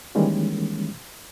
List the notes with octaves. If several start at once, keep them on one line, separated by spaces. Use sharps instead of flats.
D#3 E3 G3 G#3 A#3 C#4